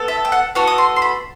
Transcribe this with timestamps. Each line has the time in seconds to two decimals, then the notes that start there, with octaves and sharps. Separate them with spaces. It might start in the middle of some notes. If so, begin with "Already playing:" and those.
Already playing: B3 A4
0.08 E5
0.25 G5
0.32 F#5
0.55 B3 F#4 A4 F#5
0.67 D#6
0.78 C6
0.96 C6
1.02 B5